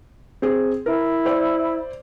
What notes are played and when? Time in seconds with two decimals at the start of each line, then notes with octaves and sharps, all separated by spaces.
0.42 C4 G#4
0.86 E4 A#4
1.25 C5 D5